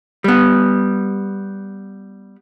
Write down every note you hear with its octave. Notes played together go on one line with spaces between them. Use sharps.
G3 B3